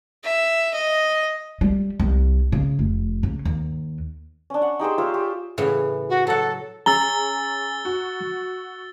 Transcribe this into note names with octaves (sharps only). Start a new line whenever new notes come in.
E5
D#5
G3
C2
C#3
F1
C#3
D#2
C#4 D4
F#5
D#4 G4 G#4 C5
F4 C5 C#5 E5
G4
A2 C#3 E3
F#4
F#3 A4 F#5
C#4 G#4 A#5 E6 A6 G7
F#4